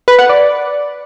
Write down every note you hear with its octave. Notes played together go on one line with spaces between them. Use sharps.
B4
F#5
D5